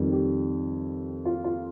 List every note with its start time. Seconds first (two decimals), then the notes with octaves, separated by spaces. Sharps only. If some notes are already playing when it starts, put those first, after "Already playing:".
Already playing: F2 D#3 G3
0.13 G4
1.25 F4
1.44 F4